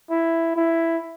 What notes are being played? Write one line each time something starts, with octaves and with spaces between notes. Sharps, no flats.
E4
E4